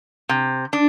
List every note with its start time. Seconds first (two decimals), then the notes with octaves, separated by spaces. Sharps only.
0.29 C3
0.73 D4